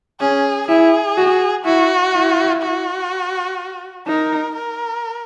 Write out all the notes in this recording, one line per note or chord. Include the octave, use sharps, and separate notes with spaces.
C#4 G#4
E4 G#4
F#4
E4 F#4
E4
F#4
D#4 A#4
A#4